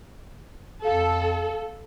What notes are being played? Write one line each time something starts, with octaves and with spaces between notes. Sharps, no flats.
F2 A4 F5